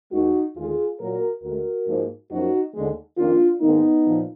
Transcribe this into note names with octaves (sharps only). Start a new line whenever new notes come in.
D#2 D#3 G#3 D#4 F#4
D#2 D3 G#3 F4 G#4
A#2 F#3 A#3 F#4 A#4
D2 D3 G#3 F#4 A#4
G#2 F3 A#3
F#2 F3 A#3 D#4 F#4
D#2 D3 G#3
F2 D#3 A#3 D4 F4
G#2 D#3 A#3 B3 D#4
A#2 F3